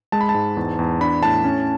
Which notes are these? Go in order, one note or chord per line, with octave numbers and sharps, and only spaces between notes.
G#3 A5
B5
A5
G#2
E2
E2
D4 B5
A2 A5
C#4